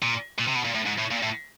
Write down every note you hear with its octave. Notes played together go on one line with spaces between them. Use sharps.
A#2
A#2
C3
B2
A#2
A2
G#2
A2
A#2
A2